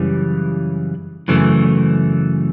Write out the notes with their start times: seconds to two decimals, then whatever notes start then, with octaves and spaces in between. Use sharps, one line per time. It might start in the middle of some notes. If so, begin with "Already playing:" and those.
Already playing: F#2 C#3 E3 G3
1.28 F#2 C#3 E3 A3